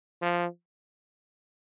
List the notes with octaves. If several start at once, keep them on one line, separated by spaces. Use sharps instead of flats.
F3